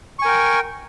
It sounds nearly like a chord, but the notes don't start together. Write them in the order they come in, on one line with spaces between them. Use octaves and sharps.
C#6 G#5 A#4 G5